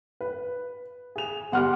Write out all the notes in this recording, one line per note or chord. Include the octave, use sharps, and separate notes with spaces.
B4
G#4 F7
G1 G4 F#5 C6 D6 F6